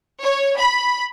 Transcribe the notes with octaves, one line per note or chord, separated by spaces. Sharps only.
C#5
B5